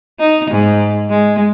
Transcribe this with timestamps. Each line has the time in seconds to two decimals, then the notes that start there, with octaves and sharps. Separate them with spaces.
0.20 D#4
0.51 G#2
1.10 G#3